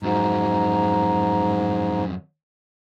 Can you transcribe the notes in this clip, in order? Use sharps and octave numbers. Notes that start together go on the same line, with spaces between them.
F2 G#2 F#3 A#5